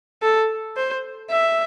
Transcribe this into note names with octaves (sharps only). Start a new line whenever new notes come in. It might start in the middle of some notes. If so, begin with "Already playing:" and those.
A4
C5
E5